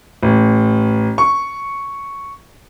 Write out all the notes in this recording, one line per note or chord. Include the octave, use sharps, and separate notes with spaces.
A1
C#6